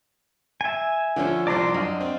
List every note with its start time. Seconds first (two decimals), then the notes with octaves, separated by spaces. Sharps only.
0.61 E5 G#5
1.16 D3 F3 C#4
1.47 C2 F3 D5 A5 A#5 C6
1.74 F#2 D4 D#5 F5
2.01 C4